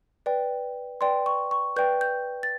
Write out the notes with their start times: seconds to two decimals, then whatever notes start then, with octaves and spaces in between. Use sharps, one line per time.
0.26 B4 D5 G5
1.01 B4 D5 G5 C6
1.26 C#6
1.51 C#6
1.76 B4 D5 G5 G6
2.01 G6
2.43 A6